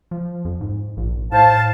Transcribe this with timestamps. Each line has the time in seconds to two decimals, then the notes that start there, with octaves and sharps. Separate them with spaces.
0.11 F3
0.45 F2
0.61 G#2
0.97 A#1
1.32 A2 C5 F5 A5